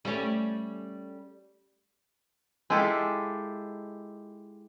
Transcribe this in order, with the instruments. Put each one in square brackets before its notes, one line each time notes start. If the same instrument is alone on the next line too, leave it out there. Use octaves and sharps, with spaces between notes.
[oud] G3 A3 C#4
[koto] G#3 E4 F4 G4 A4